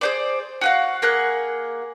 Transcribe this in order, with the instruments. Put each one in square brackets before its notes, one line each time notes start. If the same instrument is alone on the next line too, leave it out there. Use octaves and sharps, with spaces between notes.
[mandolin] G#4 C5 D5
F#4 F5 F#5
A#3 G#4 F#5 F#6